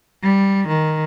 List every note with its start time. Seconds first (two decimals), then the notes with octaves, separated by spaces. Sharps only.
0.23 G3
0.68 D#3